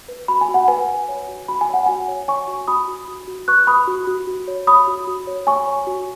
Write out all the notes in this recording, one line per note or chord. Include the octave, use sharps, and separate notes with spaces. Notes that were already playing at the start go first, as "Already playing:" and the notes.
B4
F#4 B5
G#5
F#4
F#5
B4 G#5
B4
C#5
F#4
F#4 B5
G#5
C#5 F#5
F#4 G#5
C#5
C#5 G#5 C#6
F#4
F#4 B5 D#6
F#4
F#4
F#4
B4 C#6 F#6
B4 B5 D#6
F#4
F#4
F#4
C#5
C#5 B5 D#6
F#4
F#4
C#5
C#5 G#5 C#6
C#5
F#4